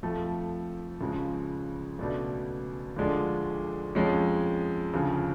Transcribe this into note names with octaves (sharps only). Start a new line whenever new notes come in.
F2 F3 A3
C#2 C#3 F3 G#3
C#2 B2 A3 D4
D2 D3 F3 G#3 D4
F2 F3 G#3 C#4
D2 C#3 F3